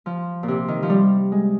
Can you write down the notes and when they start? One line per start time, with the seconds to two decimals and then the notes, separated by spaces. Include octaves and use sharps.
0.06 F3
0.43 A#2
0.48 C3
0.68 D#3
0.83 F3
0.90 G3
1.32 G#3